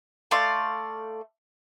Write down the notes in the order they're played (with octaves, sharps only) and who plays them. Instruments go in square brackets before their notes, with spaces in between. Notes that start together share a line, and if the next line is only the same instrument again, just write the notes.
[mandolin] A3 D5 F5 C6